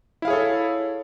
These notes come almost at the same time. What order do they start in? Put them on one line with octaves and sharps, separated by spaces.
E4 F5 G#4 C#5 A4